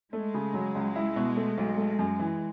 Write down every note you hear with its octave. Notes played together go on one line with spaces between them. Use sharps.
G#3 A3
C#3
F#3
C#2
E4
B2
A3
B1
A3
F#2
E3